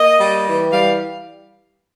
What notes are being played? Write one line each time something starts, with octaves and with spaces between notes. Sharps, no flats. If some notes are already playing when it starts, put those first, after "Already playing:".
Already playing: A#3 D#5
G3
E3
G3 F5